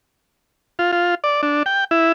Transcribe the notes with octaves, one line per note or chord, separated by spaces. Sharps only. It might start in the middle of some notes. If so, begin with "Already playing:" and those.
F4
F4
D5
D4
G5
E4